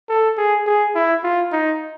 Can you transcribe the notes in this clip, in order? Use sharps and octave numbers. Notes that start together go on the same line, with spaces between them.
A4
G#4
G#4
E4
F4
D#4